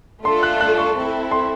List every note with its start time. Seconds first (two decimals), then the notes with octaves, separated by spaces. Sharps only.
0.25 A3 D4 F4 A4 C6
0.43 F#6
0.61 F#6
0.78 C#6
0.96 C4 E4 A4
1.31 C6